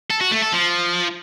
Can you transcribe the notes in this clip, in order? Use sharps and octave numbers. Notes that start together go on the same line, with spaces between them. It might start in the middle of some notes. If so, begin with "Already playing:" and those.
A4
F#4
A3
A4
F3